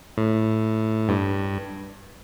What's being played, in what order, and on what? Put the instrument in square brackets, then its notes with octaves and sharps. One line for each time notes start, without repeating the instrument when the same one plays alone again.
[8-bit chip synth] A2
G2